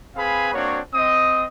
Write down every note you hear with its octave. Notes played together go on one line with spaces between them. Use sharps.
C4 G#4 B4 F5 G#5 B5
A#3 C4 D4 F#4 C#5
C4 D#5 D#6